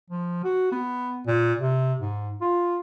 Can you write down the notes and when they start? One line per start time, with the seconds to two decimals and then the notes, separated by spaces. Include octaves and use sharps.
0.10 F3
0.44 F#4
0.72 B3
1.27 A#2
1.59 C3
2.00 G#2
2.41 F4